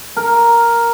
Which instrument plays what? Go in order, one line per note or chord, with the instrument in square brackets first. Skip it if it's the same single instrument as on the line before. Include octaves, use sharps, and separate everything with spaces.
[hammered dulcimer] A#4